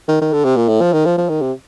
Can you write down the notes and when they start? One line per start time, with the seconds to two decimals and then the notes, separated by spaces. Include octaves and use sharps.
0.08 D#3
0.21 D#3
0.33 D3
0.45 C3
0.57 A#2
0.68 A2
0.81 F3
0.93 D#3
1.06 F3
1.18 F3
1.29 D#3
1.42 C3